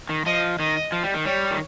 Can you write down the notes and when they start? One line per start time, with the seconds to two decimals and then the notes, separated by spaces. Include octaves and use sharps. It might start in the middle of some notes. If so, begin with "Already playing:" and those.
0.09 D#3
0.26 F3 D#5
0.59 D#3 D#5
0.92 F3
1.03 G3
1.14 D#3
1.25 G3 C#5
1.51 D#3